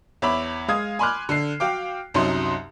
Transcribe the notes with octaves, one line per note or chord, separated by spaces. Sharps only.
E2 C#5 E5 B5 D6
G#3 F5 D#6 G#6
G#5 B5 C6 D6 F6 F#6
D3 C7
F#4 F5 G5 D6
C2 F#2 F#3 D#4 C6